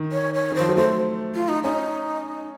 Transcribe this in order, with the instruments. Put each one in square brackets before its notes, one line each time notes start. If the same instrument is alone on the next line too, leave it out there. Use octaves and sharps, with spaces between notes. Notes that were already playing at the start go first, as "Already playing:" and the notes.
Already playing: [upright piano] D#3
[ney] C#5
C#5
[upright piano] D#3
[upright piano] F3 [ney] C5
[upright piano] F#3
[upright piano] A3 [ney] C5
[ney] F4
D#4
[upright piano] C#4 [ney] D#4